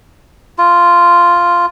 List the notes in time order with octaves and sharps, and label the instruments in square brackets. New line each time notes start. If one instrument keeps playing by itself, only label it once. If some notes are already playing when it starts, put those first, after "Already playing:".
[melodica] F4